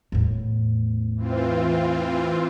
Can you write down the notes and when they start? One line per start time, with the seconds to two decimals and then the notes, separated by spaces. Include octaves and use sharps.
0.12 E2 A2
1.16 E3 C4 F4